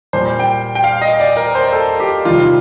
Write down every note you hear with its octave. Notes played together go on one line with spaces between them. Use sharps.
A#2 G3 C5
G5
G5
F5
D#5
D5
A#4
C5
A4
G4
C3 D#3 G3 F4